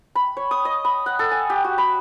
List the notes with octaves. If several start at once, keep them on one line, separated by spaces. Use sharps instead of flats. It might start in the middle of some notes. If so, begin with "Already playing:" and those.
B5
C#5
D#6
D#5
B5
F#5
A4
G#5
G4
F#4
B5